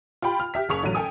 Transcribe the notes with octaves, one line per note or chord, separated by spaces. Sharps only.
F4 G4 G5 B5
F6
G4 E5 B6
F#1 G#4 C#6 F7
A1 D3 F#3 D#7
A4 G5 G#5 D#6